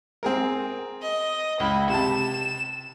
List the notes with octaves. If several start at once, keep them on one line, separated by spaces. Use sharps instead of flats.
C4 G#4 A#4
D#5
C#2 E4
C3 A5 E7